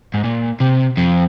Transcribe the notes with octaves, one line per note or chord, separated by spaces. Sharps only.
G#2
A#2
C3
F2